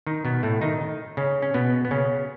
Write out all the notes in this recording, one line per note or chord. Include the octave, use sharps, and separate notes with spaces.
D#3 D#4
B2 B3
A2 A3
D#3 D#4
C#3 C#4
C#4
B2 B3
B3
C#3 C#4